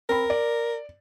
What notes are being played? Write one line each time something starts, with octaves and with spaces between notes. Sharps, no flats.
C4 A#4 B5
D5